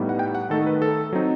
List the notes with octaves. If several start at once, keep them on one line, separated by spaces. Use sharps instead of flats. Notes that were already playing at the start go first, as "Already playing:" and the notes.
Already playing: A2 G3 B3 D#4
F#5
G5
F#5
D#3 A3 D#4 A4
B4
A4
F#3 C4 D#4